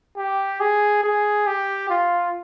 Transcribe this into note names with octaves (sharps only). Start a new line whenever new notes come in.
G4
G#4
G#4
G4
F4